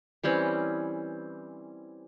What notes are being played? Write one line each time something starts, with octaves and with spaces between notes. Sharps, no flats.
E3 G3 C4 C#4